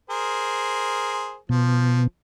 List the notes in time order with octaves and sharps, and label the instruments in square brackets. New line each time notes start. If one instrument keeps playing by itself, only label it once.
[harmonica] G#4 A#4 C5
[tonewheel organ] B2 [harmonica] F3